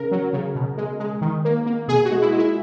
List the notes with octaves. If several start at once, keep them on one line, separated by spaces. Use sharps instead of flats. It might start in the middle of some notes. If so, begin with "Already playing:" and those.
Already playing: C#3 A#4
F#3
C#3
B2
G#3
G#3
D#3
A#3
A#3
B2 G#4
F#4
G#3
E4
G#3
E4